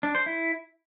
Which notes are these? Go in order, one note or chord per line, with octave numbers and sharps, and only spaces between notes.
D4
C5
E4